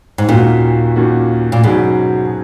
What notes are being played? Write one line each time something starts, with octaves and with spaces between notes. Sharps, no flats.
G#2
D#2 A#2 D#3 A#3 C#4 F#4
D#2 D#3 A#3 C#4 F#4
A#2
G#2 B2 D#3 F#3 C#4 G#4